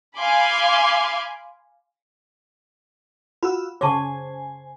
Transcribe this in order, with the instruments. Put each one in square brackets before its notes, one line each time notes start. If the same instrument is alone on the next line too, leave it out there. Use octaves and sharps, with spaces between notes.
[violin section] F5 G#5 B5 C6 D6
[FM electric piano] F4 F#4 E6 [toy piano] B5
[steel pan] C#3 C#5 [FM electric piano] C5 G#5 [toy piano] A5 C#6 D6